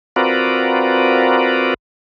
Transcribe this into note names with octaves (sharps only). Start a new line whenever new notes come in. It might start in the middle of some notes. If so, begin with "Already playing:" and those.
C4 F4 F#4 A#4 B4 D5